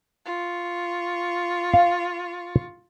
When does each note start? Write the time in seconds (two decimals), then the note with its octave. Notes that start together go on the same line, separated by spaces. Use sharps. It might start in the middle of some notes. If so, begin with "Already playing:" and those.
0.26 F4 C#6
1.73 F5